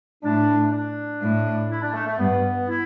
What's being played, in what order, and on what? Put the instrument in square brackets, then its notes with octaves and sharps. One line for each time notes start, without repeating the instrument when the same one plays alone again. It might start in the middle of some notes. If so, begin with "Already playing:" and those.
[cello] A2 [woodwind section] D4
[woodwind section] D4
[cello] A2
[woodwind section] E4
D4
A3
A3
[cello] G2 [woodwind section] B3
[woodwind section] E4